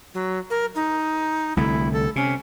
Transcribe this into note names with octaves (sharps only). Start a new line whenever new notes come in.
F#3
A#4
D#4
C2 D3 A3 E4
A4
C3 C#4